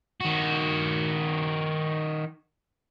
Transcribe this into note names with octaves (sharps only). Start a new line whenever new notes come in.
D#3 F#4